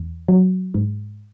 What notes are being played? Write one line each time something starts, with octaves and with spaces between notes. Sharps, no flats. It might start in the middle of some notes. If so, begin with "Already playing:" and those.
Already playing: E2
F#3
G#2